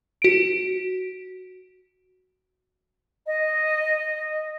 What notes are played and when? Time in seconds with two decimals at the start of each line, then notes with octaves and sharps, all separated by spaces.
0.22 F#4 D7
3.27 D#5